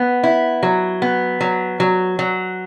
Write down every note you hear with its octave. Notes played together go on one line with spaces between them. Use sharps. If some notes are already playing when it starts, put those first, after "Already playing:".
Already playing: B3
E4
F#3
B3
F#3
F#3
F#3